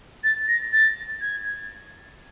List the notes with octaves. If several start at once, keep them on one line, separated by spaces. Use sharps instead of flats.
A6
A#6
A6
G#6